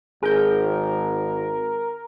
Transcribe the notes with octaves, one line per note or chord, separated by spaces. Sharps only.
G#1 G#4 A#4 G6